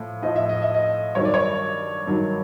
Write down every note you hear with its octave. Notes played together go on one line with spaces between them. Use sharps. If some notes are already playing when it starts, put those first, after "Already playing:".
Already playing: A2 F3
A2 F3 D#5
E5
D#5
E5
D#5
G2 D#3 F#3 C#5
D5
C#5
G2 D#3 F#3